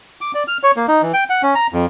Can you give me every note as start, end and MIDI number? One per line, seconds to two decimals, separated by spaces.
0.21 0.32 86
0.34 0.43 74
0.48 0.58 89
0.63 0.71 73
0.76 0.86 58
0.88 1.02 63
1.02 1.12 52
1.14 1.24 79
1.30 1.42 78
1.43 1.54 61
1.55 1.67 82
1.73 1.86 41